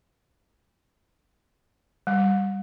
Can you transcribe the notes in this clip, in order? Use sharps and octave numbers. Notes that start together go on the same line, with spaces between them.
G3